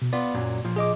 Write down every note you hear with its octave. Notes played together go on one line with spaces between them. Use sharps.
B2
B3 F4 D5
F#2 A#2 F#3
A#2 F3
G#4 D#5 D6